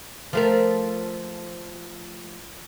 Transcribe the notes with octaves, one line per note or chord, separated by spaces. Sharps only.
F3 A3 A#4